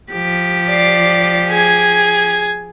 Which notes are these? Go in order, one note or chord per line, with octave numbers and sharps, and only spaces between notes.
F3 G4
D5 C7
G#4 G#6